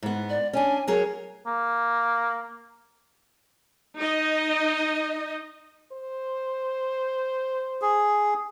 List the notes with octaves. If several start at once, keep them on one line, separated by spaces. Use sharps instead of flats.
G#2 B3
D5
C#4 D4 G#5
F#3 G#4 A#4 C#5
A#3
D#4 D#5
C5
G#4